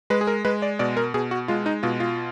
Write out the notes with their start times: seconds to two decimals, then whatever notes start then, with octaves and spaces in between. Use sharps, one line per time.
0.10 G#3 B4
0.21 G#4
0.27 A#4
0.45 G#3 B4
0.62 D5
0.79 B2 D5
0.97 A#4
1.14 B2 G#4
1.31 F#4
1.48 G#3 F4
1.66 D#4
1.83 B2 F4
2.00 F4